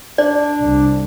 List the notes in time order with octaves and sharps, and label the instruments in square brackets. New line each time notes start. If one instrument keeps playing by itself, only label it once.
[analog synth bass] D4 [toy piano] D5
[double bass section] C2